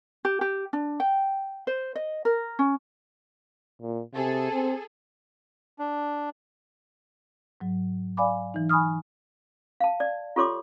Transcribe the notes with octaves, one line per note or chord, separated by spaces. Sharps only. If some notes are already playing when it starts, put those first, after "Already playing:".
G4
G4
D4
G5
C5
D#5
A#4
C#4
A#2
C3 G#4 A4
C4
D4
G#2 F#3
D5 F5 G#5 B5 D6
E3 D#4
G#5 B5 C#6 D#6 F6
F5 A5
D5
F4 G4 A4 C#5 C6 D6